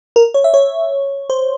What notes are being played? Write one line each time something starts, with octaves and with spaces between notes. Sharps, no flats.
A#4
C#5
E5
C#5
C5